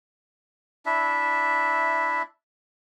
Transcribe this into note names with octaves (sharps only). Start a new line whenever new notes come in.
D4 E4 E5